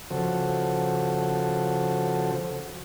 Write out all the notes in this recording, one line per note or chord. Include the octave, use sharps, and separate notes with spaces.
C#3 F3 F#4 A4 C5